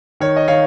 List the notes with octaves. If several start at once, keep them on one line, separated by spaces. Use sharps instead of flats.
D#3 C#5
D#5
D#3 C#5 F5